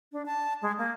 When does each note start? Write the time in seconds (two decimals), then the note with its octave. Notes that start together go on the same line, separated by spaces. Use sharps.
0.12 D4
0.26 A5
0.62 G#3
0.78 A#3